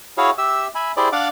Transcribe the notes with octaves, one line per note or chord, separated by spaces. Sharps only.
E4 F#4 G#4 C#5 F5
G4 E5 E6
E5 G#5 B5
E4 G4 G#4 C5 D5
D4 D5 F5 F#5 D6